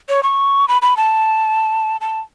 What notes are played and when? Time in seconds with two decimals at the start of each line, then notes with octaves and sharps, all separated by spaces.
0.09 C#5
0.23 C#6
0.68 B5
0.82 B5
0.97 A5
2.01 A5